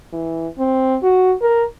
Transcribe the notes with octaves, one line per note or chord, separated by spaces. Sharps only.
E3
C4
F#4
A#4